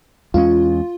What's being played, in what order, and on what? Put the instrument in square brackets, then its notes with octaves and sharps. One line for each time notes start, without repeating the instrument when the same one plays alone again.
[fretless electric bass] E2 G#3 C#4 [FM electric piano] F4